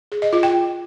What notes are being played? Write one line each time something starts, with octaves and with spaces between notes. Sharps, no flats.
G#4
D#5
F4
G5